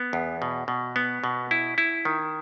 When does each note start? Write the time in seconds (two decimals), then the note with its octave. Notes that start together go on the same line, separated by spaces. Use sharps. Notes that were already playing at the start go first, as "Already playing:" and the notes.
Already playing: B3
0.13 E2
0.42 B2
0.68 B2
0.96 B3
1.24 B2
1.51 E4
1.78 E4
2.05 D#3